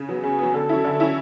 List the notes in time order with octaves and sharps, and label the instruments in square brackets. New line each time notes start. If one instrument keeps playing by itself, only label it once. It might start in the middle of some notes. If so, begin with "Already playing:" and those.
Already playing: [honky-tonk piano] C#3
F#3 B3
[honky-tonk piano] C#3 [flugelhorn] G#4
[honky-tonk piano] F#3 B3
[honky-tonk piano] D3 [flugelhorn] A4
[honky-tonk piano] F#3 C#4 E4
D3
F#3 C#4 E4